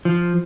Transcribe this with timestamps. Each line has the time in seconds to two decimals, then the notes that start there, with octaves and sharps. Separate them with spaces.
0.05 F3